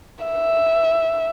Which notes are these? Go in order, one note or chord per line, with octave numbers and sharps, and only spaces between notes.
E5